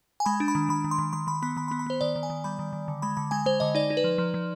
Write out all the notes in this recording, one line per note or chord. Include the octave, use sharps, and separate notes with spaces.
G#5
G#3 B5
D4
B5
D#3
D#3 B5
D#3
C6
D#3
D#3 C6
D#3 B5
B3 B5
D#3 B5
B5
B3
B5
B3 C5
D#3 D5
D#3
G#5
D#3
G3 B5
D#3
D#3
D3
G#3 B5
D3 B5
G#3 G#5
G#3 C5
D3 D#5
D#4 D5
D#4
B4
F3
F3
F3